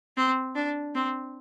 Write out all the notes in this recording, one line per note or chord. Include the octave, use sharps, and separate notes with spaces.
C4
D4
C4